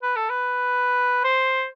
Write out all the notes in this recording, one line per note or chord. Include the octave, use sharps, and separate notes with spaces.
B4
A4
B4
C5